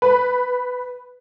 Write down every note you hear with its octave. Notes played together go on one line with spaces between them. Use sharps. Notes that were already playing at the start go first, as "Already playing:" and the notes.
B4